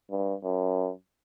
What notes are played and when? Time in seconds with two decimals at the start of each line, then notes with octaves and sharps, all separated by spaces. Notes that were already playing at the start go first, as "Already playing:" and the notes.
0.11 G2
0.44 F#2